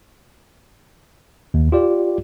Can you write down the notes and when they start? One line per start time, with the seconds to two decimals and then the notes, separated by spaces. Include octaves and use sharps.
1.54 D#2
1.72 F4 G4 D5